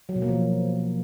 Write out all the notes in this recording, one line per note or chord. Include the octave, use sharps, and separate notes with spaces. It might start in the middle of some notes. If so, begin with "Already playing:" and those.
F#3
B2
A#3
F3